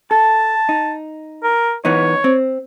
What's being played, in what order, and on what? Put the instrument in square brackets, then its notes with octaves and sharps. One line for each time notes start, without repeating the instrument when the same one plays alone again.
[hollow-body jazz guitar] A4 [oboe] A5
[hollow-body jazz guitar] D#4
[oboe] A#4
[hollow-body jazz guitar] E3 B3 D#4 [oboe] C#5
[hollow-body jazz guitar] C4